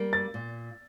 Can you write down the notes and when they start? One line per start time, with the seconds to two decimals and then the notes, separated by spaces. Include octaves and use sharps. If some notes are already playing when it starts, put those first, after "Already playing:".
Already playing: G3 A#3
0.13 A6
0.34 A#2